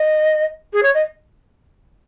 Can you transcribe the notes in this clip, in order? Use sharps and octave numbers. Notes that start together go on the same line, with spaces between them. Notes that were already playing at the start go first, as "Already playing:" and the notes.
Already playing: D#5
G#4
C#5
D#5